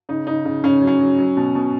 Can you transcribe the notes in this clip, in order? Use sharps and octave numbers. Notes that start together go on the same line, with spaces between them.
C#3 D#4
C#3 D#4
C#3
C#3 C#4
F#3
C#4
F#3
F#3
B2
B2